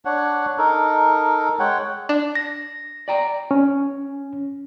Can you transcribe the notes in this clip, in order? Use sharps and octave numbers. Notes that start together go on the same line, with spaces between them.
D4 C#5 F#5
D#4 A4 A#4
G#3 C#5 F#5 G5
D4
A#6
D5 G5 A#5
C#4